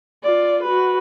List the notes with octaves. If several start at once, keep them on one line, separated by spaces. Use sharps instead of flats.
F4 D5
F#4 B4